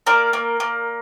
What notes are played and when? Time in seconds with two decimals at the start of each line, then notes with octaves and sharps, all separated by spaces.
0.07 A#3 A#4 D5
0.33 A#3
0.60 A#3